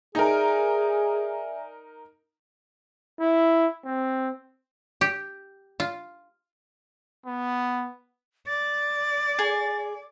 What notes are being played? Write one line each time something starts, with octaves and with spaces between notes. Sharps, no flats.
D#4 G#4 A#4 D5 E5 G#5
E4
C4
G4
F4
B3
D5 A6
G#4